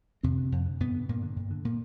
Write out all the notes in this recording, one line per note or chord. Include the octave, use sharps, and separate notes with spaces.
F2 C3 C4
D3
F2
D3
G2 B2 B3
D3
G2 A#2 A#3
D3
G2
D3
A#2 A#3